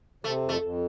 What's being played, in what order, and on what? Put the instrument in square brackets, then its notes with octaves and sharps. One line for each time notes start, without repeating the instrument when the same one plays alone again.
[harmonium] C3 [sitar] A3
[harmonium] F2
[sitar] A3
[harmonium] F2